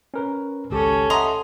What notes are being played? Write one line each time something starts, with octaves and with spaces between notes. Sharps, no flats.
C#4 A#4 B4
G#1 C#2 C#4 G4 A4
D#5 E5 F#5 A#5 C6 D#6